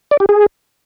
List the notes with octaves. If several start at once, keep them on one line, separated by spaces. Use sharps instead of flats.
D5
G4
G#4